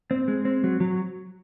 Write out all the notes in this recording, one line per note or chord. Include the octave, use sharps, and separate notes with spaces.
C4
G#3
C4
F#3
F#3